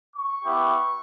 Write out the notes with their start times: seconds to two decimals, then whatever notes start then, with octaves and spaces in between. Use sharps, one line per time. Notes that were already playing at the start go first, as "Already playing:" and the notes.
0.16 C#6
0.44 B3 E4 G4